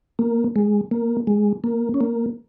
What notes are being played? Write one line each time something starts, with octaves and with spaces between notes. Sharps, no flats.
A#3
G#3
A#3
G#3
A#3
C#4
A#3